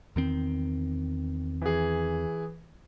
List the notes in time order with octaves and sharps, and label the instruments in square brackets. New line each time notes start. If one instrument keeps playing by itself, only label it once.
[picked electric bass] E2 D#3 C4
[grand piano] E3 G#4